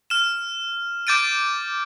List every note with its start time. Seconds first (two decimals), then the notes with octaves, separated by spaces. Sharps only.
0.10 F6 E7
1.07 D6 G6 A6 D7 D#7